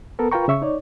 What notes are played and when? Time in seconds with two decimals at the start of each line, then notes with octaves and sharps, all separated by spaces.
0.19 B3 A4 A#4
0.32 F4 A#4 B4 G5 A#5 C#6
0.48 C#3 E5 C#6
0.62 D#4 C#5 D5